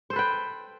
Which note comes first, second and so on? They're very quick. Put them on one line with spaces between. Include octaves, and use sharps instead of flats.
C5 A4 B4 G5